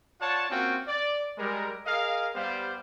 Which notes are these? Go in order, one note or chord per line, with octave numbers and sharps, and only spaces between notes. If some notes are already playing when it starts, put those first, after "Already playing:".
F4 C#5 D5 F#5 A5
A#3 C4 C#4 F4 F#4 G5
D5
G3 G#3 A#4
G#4 A#4 D#5 F5
G3 B3 G4 C5 F5